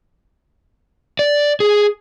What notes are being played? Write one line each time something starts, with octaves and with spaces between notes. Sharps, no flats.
D5
G#4